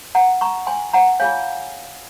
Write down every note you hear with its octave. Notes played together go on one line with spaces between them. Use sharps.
F#5 A#5
A#5 C#6
G#5 C6
F#5 A#5
F4 G#4 C#5 F5 G#5